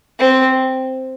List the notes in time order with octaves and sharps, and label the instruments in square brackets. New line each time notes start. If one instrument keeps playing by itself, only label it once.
[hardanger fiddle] C4